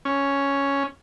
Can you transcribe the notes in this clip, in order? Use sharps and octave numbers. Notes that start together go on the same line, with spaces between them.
C#4